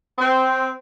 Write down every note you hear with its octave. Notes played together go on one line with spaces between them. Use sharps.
C4